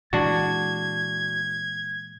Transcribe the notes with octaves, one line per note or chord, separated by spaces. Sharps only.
A#2 E3 G#3 D4 F#4 G#6